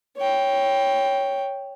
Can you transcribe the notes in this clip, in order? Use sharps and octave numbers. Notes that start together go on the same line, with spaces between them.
C#5 G5